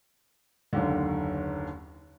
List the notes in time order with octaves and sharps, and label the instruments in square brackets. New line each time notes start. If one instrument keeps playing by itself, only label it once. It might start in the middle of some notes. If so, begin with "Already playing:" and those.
[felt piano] F#1 D#2 D3